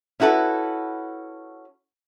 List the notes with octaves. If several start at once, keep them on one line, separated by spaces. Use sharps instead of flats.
C#4 E4 F#4 A4 B4